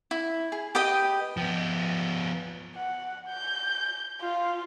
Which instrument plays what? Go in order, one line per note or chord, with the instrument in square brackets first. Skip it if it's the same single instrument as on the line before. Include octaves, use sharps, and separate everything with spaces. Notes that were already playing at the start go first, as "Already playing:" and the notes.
[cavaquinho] E4
G#4
G4 B4 D#5 G5
[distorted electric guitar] F3 B3
[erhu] F#5
G6
F4